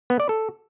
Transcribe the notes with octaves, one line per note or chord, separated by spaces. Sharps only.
B3
D5
A4